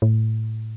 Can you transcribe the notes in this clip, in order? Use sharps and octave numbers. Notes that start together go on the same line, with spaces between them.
A2